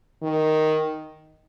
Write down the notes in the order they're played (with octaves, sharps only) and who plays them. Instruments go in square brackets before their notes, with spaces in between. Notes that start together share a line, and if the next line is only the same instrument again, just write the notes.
[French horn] D#3